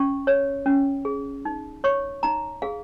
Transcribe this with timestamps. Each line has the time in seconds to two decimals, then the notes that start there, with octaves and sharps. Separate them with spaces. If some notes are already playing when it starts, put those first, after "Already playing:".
Already playing: C#4 C#6
0.27 C#5
0.66 C#4
1.05 G#4
1.45 D#4
1.84 C#5 C#6
2.23 D#4 A#5
2.62 G#4 F5